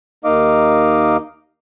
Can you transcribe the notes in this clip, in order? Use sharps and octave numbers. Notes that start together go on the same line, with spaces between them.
D#2 A#3 D#4 D#5 F5 D6